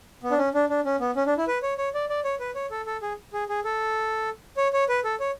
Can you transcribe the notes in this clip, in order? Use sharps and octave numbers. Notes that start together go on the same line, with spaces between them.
B3
D4
C#4
D4
D4
C#4
B3
C#4
D4
E4
B4
C#5
C#5
D5
D5
C#5
B4
C#5
A4
A4
G#4
G#4
G#4
A4
C#5
C#5
B4
A4
C#5